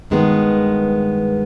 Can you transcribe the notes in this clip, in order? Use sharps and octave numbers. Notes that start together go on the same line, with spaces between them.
G2 D#3 G#3 B3